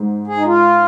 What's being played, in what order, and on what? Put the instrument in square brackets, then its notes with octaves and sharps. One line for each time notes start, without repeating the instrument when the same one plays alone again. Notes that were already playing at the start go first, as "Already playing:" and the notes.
Already playing: [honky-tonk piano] G#2
[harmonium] G#4
D#4
F4